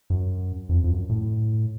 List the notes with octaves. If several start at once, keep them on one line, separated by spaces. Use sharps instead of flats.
F#2
F2
F2
F#2
A2